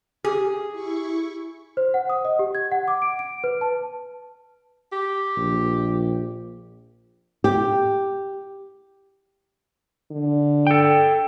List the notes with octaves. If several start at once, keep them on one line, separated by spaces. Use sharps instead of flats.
G4 G#4
E4 C#6
C5
F#5
D#6
D#5
G4
G#6
F#5
D6
D7
D7
B4
A5
G4
A#1
G4
D3
A4 G5